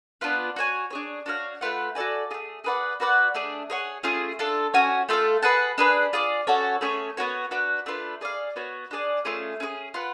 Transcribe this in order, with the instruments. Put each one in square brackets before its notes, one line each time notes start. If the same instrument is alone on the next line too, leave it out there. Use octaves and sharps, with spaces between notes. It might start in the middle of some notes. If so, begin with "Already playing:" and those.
[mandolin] B3 D4 F4 B4
F#4 C#5 G#5
D4 G#4 C#5
D4 F#4 C#5 F5
A3 F4 B4 F#5
F#4 A4 D5 G#5
F4 G#4
A3
G#4 B4 D5 F#5
F#4 B4 D5 F#5
A3 D4 G#4
G#4 C#5 F#5
A3 C#4 F4 G#4
D4 F4 A4
C#4 F#4 C#5 G#5
A3 F4 A4 F5
G#4 B4 F#5 A5
D4 G#4 B4
F4 G#4 D5
C#4 F#4 A4 C#5
A3 C#4 G#4 C#5
B3 D4 F#4 C#5
D4 F#4 B4
A3 D4 F4 B4
G#4 D5 F5
B3 F#4 C#5
D4 G#4 D5
A3 C#4 F4 G#4
C#4 F4 G#4
F4 B4 F#5